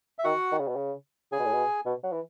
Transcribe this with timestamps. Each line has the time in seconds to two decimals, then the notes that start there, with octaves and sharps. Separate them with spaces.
0.19 E5
0.24 D#3 F#4 F#5
0.52 D#3
0.60 C#3
0.68 B2
0.76 C#3
1.32 C#3 G#4 G#5
1.39 B2
1.46 A2
1.54 B2
1.85 B2
2.04 F#3
2.12 E3